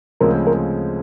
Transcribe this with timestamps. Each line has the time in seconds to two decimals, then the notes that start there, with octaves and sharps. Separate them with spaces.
0.20 D2 C#3 F3 G#3 C4 A#4
0.47 A#4